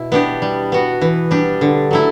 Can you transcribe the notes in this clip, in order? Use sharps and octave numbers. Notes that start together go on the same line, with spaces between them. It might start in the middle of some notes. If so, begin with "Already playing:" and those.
Already playing: B2 E4
B3 D4 G4
G3
B3 F#4
E3
G3 D4 G4
D3
F#3 A3 E4